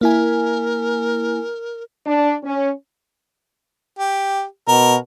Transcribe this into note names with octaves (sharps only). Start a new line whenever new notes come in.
A#3 E4 A#4 G#5
D4
C#4
G4
B2 A#4